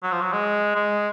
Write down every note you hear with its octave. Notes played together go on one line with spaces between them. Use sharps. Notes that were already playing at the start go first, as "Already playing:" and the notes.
F#3
F3
F#3
G#3
G#3